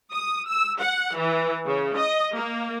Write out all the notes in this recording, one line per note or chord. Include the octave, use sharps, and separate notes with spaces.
D#6
E6
F#5
E3
C#3
D#5
A#3